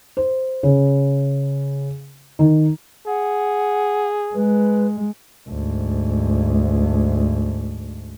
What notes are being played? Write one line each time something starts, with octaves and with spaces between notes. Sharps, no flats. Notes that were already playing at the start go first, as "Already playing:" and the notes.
C5
C#3
D#3
G#4 F#5
G#3 B4
D2 G#2